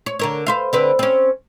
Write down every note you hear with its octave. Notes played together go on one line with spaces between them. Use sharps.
C#5
D3 A#4 C#5
B4 C5 F5
D3 C4 B4
C4 C#4